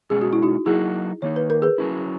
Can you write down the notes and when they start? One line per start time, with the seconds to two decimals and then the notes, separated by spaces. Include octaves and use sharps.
0.10 B2 G#3 C#4 G#4
0.21 F#4
0.33 E4
0.42 D#4 F#4
0.66 F#3 A#3 D#4 E4 F#4 G#4
1.22 D#3 A#3 D#4 C#5
1.36 B4
1.50 A#4
1.62 G#4 B4
1.78 F#3 C#4 E4